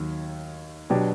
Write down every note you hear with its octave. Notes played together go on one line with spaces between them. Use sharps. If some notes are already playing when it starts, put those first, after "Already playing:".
Already playing: D#2 D#3 F#3
B2 F#3 B3 D4 G4